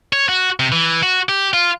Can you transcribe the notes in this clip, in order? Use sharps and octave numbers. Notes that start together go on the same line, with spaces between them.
C#5
F#4
C3
E3
F#4
G4
F4